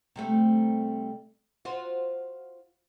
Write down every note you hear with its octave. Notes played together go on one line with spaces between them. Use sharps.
C3 G3 A3
F4 F#4 C5